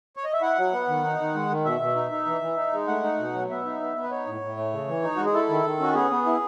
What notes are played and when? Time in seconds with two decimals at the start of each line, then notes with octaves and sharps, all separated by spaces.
0.17 C#5
0.24 D#5
0.34 E5
0.42 E4 F#5
0.58 F#3
0.73 B3
0.88 D#3
1.04 D#4
1.19 D#3
1.35 G#3
1.49 D#3
1.65 B2 E5
1.81 B2
1.96 D#4
2.11 D#4
2.26 E3
2.41 E3
2.57 D#4
2.73 G#3
2.88 A3 F#5
3.03 D#4
3.19 B2
3.34 F#3
3.50 B3 E5
3.65 D#4
3.81 B3
3.96 B3
4.03 B4
4.11 D#4 C#5
4.26 A2
4.41 A2
4.57 A3
4.72 C#3
4.88 E3
5.03 D#4
5.16 G#3 F#4
5.26 G#4
5.34 E4 A4
5.49 D#3
5.64 D#3
5.80 C#4 F#4
5.95 B3 G#4
6.11 B3
6.26 E4